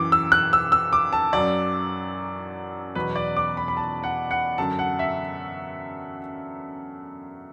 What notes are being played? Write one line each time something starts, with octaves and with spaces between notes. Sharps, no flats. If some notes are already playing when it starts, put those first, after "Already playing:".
Already playing: F#2 E3 D6
E6
F#6
E6
E6
D6
A5
F#2 F#3 D5
E2 B2 F#3 B4
D5
D6
B5
B5
A5
F#5
F#5
F#2 D3 F#3 A5
F#5
E5